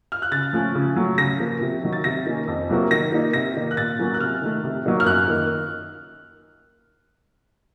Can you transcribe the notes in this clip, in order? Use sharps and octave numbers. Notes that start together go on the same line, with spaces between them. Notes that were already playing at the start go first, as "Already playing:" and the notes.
F6
F#6
C#3 A6
F3 A3 C#4
C#3
F#3 A3
C#3 A#6
F3 A#3
C3
D#3 F#3
A6
C3 A#6
D#3 A#3 C#4
F2
C3 F#3 A#3
D#3 A#6
A#3 D#4
C3 A#6
D#3 A#3 D#4
F#6
A#2 A6
F#3 A#3 C#4
F#6
C3 F6
D#3 A3
C3
F#3 A#3 D#4
F6
F#2 F#6
D#3 A#3